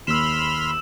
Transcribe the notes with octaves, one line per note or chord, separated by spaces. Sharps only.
D#2 B5 C6 E6 F6 E7